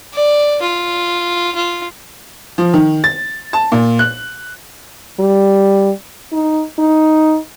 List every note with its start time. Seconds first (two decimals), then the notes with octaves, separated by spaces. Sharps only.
0.14 D5
0.62 F4
1.56 F4
2.58 F3
2.74 D#3
3.04 A6
3.53 A5
3.72 A#2
3.99 F#6
5.19 G3
6.33 D#4
6.79 D#4